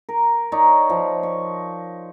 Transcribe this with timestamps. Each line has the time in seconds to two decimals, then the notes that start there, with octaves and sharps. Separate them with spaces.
0.09 A#4
0.52 D#4 C#5 D5
0.90 F3
1.23 C#6